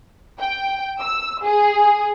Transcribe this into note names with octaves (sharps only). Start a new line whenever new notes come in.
G5
E6
G#4